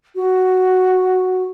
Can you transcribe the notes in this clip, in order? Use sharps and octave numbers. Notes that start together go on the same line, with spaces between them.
F#4